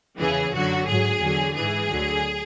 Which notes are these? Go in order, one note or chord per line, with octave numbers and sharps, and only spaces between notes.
E2 C#3 E3 G#4
F#2 D3 F#3 F#4
G#2 F#3 G#4
E2 D3 F#3
G#2 E3 G#4
D2 D3 F#3